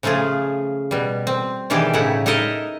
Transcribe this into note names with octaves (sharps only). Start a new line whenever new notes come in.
C#3 F3 A3 F4 G#4
B2 G3
C4
B2 D#3 E3 G3 G4 G#4
A2 C#3 D#4 E4 F#5
D#4 E4 A4 A#4 D#5